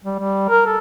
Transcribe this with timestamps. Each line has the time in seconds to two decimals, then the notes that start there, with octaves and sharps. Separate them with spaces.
0.04 G3
0.19 G3
0.49 A#4
0.66 A4